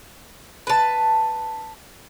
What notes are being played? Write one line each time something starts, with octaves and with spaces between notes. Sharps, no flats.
B4 A5